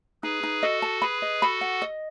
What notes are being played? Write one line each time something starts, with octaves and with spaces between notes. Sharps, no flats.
D#4 G#4 B4
D#4
F#4 A4 D#5
A5
G#4 B4 B5
D#5
F#4 A4 B5
F#5
D#5